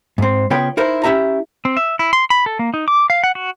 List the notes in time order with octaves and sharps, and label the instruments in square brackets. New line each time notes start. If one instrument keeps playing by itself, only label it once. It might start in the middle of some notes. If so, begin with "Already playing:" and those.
[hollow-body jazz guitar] G#2 C4
C#3 B3 F4 B4 C#5 G5
D#4 E4 A#4 C5
C#4 E4 G4 E5 A#5
[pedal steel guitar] C4
E5
E4
C6
B5
A4
A#3
D#4
D6
F5
F#5
F#4